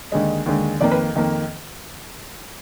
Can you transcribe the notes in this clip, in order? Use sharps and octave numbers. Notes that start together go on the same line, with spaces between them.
D#2 D3 G#3 D#5
D#2 D3 G#3
F2 D#3 A#3 D5
B4
F2 D#3 A#3